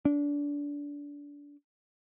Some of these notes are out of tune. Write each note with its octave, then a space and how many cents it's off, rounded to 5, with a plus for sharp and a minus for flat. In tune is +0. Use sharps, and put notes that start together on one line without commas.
D4 -25